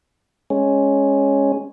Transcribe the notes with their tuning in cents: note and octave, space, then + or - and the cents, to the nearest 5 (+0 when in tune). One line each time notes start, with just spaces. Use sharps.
G#3 +0 C#4 +0